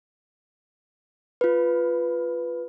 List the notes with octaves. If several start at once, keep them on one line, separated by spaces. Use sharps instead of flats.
F4 B4